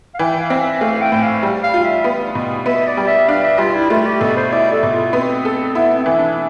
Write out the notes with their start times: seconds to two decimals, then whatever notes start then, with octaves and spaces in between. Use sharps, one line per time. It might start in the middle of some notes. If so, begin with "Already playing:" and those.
0.15 F5
0.19 E3 G5
0.40 F5
0.50 C4
0.60 E5
0.81 A3 F5
1.01 G5
1.12 A2 G5
1.22 F5
1.43 G3
1.63 F5
1.74 F4
1.84 E5
2.04 B3
2.35 B2
2.66 B3 E5
2.87 D5
2.97 G3
3.07 E5
3.28 D4 F5
3.44 E5
3.58 G3 F4
3.75 E4
3.90 A3 F4
4.06 G4
4.21 B2 A4
4.36 C5
4.52 E4 D5
4.73 A4
4.83 B2
4.93 F4
5.13 B3 C4
5.45 A4
5.75 B3 E4
5.96 C4
6.06 E3
6.17 D4